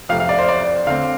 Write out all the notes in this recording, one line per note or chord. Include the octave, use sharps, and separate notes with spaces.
F2 C3 A3 F5
F5
D5
C5
D5
D3 A3 C4 F5